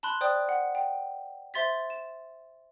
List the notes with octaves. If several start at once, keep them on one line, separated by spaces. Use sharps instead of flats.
A5 B5 C6 F#6
C5 D5 G5 D#6 F#6
F#5
G5
C5 E5 C6 A6 B6
E7